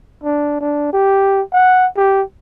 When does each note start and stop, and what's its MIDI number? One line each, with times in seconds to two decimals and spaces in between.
0.23 0.57 62
0.61 0.91 62
0.93 1.42 67
1.53 1.87 78
1.97 2.23 67